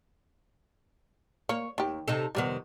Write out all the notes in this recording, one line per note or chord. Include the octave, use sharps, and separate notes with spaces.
A#3 C#5
D#2 D#3 G4
C3 D#4 A4
F2 C3 D#3 G3 A#3 B3